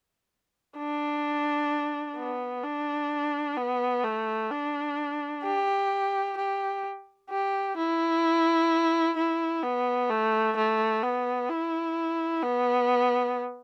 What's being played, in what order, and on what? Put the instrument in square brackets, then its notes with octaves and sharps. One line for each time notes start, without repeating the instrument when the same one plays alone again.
[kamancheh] D4
B3
D4
B3
A3
D4
G4
G4
G4
E4
E4
B3
A3
A3
B3
E4
B3